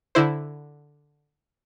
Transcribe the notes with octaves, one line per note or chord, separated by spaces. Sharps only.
D3 E4 C5